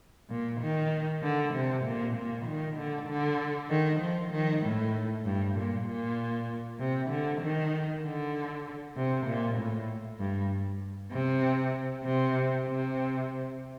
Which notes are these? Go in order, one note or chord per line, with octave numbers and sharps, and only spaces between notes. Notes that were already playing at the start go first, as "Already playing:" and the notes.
A#2
D#3
D3
C3
A#2
A#2
D#3
D3
D3
D#3
F3
D#3
A2
G2
A#2
A#2
C3
D3
D#3
D3
C3
A#2
A2
G2
C3
C3
C3